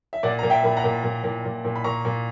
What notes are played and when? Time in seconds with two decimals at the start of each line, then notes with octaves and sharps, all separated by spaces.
0.13 E5
0.23 A#2 D5 F#5
0.39 A#2 A#5
0.50 E5 G5
0.64 A#2 B5
0.77 F#5 A#5
0.84 A#2
1.04 A#2
1.24 A#2
1.45 A#2
1.65 A#2
1.76 B5
1.84 A#2 A#5 C#6
2.05 A#2